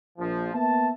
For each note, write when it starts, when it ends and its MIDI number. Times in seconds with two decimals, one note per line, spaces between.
0.19 0.50 34
0.19 0.50 53
0.54 0.91 58
0.54 0.91 59
0.54 0.91 76
0.54 0.91 81